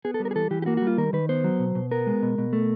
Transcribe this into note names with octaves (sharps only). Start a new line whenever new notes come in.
B3 G#4
A4
G3
A#4
G#4
E3 A4
E3 G4
G4
A#3 F#4
F#4
G3 F4
D#3 A#4
D#3 B4
B3 C5
F#3
B2
B2
B3 A#4
G#3
B2
B2
A3